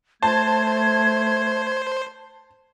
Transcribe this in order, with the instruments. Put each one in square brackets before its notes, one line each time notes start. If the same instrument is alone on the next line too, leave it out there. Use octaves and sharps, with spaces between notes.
[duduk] A3 [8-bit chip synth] C5 [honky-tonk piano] A5 [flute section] G#6